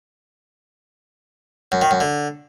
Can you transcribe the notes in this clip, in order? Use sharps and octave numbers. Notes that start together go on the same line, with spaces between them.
F#2
D#3
F#2
D3